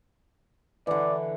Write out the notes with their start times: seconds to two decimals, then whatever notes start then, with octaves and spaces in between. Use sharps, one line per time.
0.87 D3 E3 D5